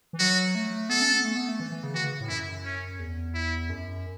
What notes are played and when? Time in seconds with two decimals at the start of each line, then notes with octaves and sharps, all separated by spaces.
0.13 E3
0.19 F#3 F#4
0.55 A3
0.89 B3 A4
1.01 C#4
1.13 B3
1.25 A3
1.36 B3
1.49 A3
1.60 E3
1.72 E3
1.83 C#3
1.94 E3 F#4
2.04 C#3
2.21 A2
2.29 F#2 E4
2.65 C#4
2.99 E2
3.34 E4
3.70 F#2